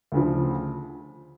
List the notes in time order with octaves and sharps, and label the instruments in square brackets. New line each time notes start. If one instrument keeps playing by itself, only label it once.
[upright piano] D2 C#3 F3